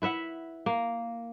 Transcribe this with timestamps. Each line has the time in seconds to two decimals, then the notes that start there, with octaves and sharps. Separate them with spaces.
0.02 E4 B4 E5 F#5
0.66 A#3